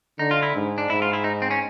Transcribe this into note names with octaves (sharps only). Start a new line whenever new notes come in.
D3 D#4
F4
E4
G#2
D4
G#2 E4
F4
E4
D#4
C4
C#4